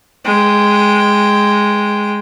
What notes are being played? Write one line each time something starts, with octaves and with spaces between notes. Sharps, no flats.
G#3 G5